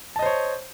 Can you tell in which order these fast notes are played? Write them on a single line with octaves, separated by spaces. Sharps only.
A5 D#5 C5 C#5